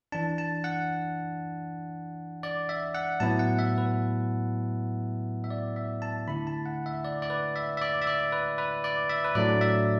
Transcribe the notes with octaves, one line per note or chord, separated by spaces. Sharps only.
E3 D4 A5
A5
F#5
D5
E5
F#5
A2 F#3 B3 E4 A5
F#5
E5
B4
E5
D5
E5
A5
D3 A3 E4 B5
A5
F#5
E5
D5
D5
B4
E5
E5
D5
E5
D5
B4
B4
D5
E5
B4
A2 F#3 A3 D4 D5
E5